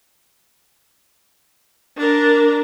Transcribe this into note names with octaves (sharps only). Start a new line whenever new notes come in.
D4 A#4